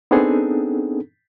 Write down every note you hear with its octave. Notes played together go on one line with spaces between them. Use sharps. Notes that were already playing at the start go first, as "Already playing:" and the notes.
B3 C4 D4 D#4 G#4 A4